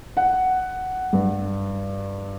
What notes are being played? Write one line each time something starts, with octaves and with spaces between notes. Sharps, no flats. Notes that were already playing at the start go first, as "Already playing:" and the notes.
F#5
G2